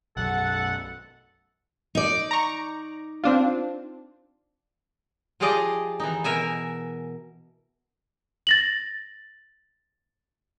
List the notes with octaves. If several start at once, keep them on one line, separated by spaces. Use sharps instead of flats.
B1 F#2 F#3 A4 F#5
D#4 D5
A#5 C#6
C4 D4 F4
F3 F4 G4 G#4 D5 D#5
E3 D#4
B2 A#4 E5 G#5
A6 A#6 F#7